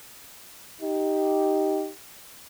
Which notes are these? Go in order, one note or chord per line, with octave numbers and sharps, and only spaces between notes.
D#4 G4